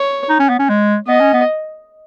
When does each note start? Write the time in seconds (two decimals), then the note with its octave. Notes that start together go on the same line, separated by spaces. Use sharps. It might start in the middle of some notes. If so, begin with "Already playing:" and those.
Already playing: C#5
0.29 D#4
0.40 C#4
0.49 B3
0.59 C#4
0.69 G#3
1.07 B3 D#5
1.20 C#4
1.33 B3